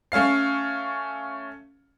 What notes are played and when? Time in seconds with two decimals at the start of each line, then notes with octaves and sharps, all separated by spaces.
0.12 A3 C#4 F5 C7